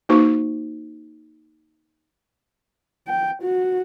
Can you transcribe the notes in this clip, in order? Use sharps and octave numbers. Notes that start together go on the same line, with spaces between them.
A#3 D#4 F#4 C5 C#6
G5
F#4